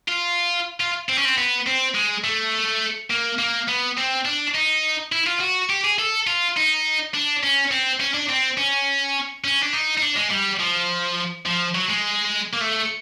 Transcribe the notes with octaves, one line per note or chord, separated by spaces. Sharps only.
F4
F4
C4
C#4
C4
B3
C4
G#3
A3
A#3
A#3
B3
C4
D4
D#4
E4
F4
F#4
G4
G#4
A4
F4
D#4
D4
C#4
C4
C#4
D4
C4
C#4
C#4
D4
D#4
D#4
D4
G#3
G3
F3
F3
F#3
G#3
A#3
A3